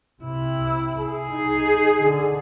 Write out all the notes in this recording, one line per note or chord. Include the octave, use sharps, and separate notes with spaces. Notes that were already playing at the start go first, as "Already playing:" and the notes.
C3 E4
G#4
D#4
D3